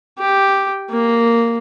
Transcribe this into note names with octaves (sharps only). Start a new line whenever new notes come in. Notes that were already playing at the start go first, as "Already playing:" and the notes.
G4
A#3